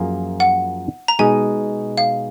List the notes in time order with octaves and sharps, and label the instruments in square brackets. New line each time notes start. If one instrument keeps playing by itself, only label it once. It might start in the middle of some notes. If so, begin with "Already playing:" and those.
Already playing: [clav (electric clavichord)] F#2 F3 A#3 F4 G#4
[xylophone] F#5
A#5
[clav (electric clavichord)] B2 G#3 D#4 G#4 D#5 [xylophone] G#5
[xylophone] F5